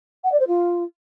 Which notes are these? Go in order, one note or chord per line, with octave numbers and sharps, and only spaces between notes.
F#5
D5
C5
F4